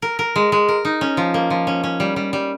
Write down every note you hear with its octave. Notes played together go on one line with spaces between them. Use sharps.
A#4
A#4
G#3
G#3
A#4
D#4
C#4
F3
A#3
F3
C#4
C#4
G3
G3
G3